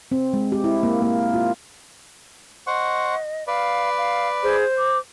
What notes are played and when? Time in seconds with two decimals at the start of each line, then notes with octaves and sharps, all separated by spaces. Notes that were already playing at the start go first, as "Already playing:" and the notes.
0.11 C4
0.33 G#3
0.52 G4
0.64 E4
0.83 A#3
1.02 A#3
1.34 F4
2.67 C5 D#5 F#5 C#6
3.47 B4 D5 F5
3.98 F5
4.43 G#4 C5
4.78 D6